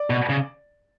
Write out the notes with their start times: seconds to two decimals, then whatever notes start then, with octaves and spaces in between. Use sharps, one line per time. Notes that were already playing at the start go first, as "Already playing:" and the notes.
Already playing: D5
0.10 B2
0.29 C#3